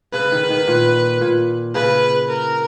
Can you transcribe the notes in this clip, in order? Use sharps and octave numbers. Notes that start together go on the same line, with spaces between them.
C#3 B4
D#3
D#3
A#2
A#2
C#3 B4
A#4